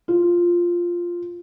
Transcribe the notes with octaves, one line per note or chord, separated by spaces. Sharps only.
F4